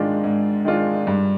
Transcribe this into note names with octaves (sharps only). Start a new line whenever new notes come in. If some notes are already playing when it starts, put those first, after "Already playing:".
Already playing: G#2 D#3 G#3 D4 F4
G#2
D#3 G#3 D4 F4
G2